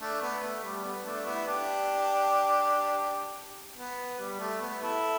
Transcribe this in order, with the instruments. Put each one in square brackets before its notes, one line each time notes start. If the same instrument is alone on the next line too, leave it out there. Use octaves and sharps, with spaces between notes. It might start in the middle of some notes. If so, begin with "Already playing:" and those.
[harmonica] A3 D4
B3
A3
G3
B3
A3 D4
B3 E4
D4 G4
B3
G3
A3
B3
E4 A4